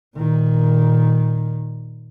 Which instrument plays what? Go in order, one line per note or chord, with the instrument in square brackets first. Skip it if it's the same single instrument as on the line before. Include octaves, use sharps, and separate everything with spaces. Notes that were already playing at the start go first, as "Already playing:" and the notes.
[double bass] A#2 D#3